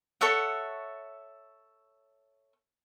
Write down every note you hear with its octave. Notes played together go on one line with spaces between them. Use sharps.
A4 C#5 E5 F#5